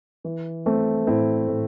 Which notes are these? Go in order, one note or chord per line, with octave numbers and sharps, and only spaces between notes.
E3
E3 A3 C4
A2 C4 E4
A2